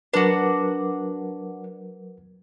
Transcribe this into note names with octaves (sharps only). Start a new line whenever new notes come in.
F#3 D4 F#4 A#4 B4